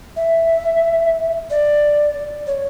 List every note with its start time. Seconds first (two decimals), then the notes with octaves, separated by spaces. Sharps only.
0.16 E5
1.50 D5
2.47 C#5